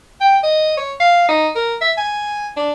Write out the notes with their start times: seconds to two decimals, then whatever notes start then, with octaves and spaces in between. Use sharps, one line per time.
0.21 G5
0.43 D#5
0.77 C#5
1.00 F5
1.28 D#4
1.55 A#4
1.81 E5
1.97 G#5
2.56 D4